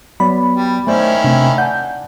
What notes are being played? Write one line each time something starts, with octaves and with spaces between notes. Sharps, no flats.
F#3 B3 D5 B5
G3
D#3 A3 C#4 E4 C5 D5
C3 A3 C4 D4
D5 F#5 G#5 A5 G6